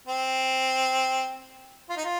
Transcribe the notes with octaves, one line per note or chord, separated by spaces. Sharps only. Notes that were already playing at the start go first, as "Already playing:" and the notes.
C4
F4
D#4
F4